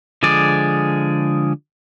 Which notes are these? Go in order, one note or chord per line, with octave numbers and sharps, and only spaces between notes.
D3 F3 G#3 G#4 D5